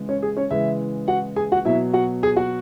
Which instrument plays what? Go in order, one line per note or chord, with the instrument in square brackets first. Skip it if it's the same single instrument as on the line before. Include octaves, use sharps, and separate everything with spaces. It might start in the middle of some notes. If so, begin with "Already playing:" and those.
Already playing: [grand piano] C#3 E3 G#3
C#4 C#5
G#4
C#4 C#5
C#3 E3 G#3 E4 E5
F#4 F#5
G#4 G#5
F#4 F#5
B2 F#3 E4 E5
F#4 F#5
G#4 G#5
F#4 F#5